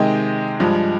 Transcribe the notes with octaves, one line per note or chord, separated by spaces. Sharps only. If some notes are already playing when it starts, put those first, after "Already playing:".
Already playing: C3 D#3 G#3 D#5 G5
G2 F3 G#3